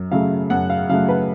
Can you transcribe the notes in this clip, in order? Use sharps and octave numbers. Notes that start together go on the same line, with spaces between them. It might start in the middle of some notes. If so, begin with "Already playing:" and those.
Already playing: F#2
C#3 F#3 A3 F5
F#2 F#5
F5
C#3 F#3 A3 F5
B4